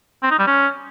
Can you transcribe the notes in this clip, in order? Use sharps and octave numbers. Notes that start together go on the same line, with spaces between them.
C4
D#4
G3
C#4